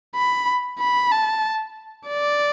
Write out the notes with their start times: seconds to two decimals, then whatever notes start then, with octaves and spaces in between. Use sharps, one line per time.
0.15 B5
0.79 B5
1.12 A5
2.08 D5